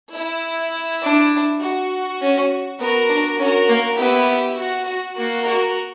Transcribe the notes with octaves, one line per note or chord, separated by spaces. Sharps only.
E4
D4
F#4
C#4
B3 F#4 A#4
D4
C#4 F#4 A#4
A#3
B3 E4 G4
F#4
F#4
A#3 F#4
F#4 A#4